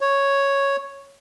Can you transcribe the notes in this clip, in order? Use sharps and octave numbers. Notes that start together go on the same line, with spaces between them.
C#5